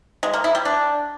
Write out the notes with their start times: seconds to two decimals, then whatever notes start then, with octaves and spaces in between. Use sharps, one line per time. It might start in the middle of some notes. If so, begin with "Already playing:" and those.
0.23 G#3
0.33 A#3
0.44 E4
0.55 G3
0.65 D4